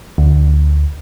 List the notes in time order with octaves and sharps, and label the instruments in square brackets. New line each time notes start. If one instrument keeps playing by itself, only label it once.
[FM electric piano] D2